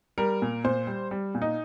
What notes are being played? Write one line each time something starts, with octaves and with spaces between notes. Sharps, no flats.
G3 A#4
A#2
A#2 C5
G3
G3
A#2
D#4